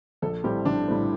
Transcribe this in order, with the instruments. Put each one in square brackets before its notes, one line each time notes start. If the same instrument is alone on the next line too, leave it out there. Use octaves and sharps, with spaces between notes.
[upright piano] A#1 [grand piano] A4
[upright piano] A2 G3 C4 [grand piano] G4
[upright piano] A#1 [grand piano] D4
[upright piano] A2 G3 C4